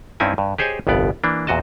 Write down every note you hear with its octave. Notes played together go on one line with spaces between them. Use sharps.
G2 C4 C#4 D#4 E4 G#5
G2
G4 G#4 C5 C#5 D#5 G#5
G1 C2 F2 B3 D5
E3 A#3 D4
E2 A#2 F#4 D#5 A5